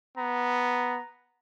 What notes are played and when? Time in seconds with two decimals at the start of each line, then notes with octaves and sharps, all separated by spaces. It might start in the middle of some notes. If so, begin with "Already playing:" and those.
0.17 B3 A#5